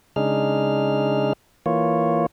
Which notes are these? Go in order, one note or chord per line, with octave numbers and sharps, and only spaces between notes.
C#3 G#3 D4 D#4 G#4 F6
E3 A#3 F4 C#5